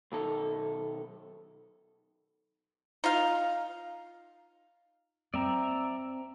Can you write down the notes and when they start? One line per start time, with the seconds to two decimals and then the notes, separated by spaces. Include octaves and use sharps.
0.12 B1 D#3 A4
3.04 D#4 F4 F5
5.34 C4 D5 E5 A#5